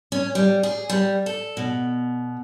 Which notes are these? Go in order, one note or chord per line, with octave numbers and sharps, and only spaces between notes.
C#4
G3
G#4
G3
A4
B2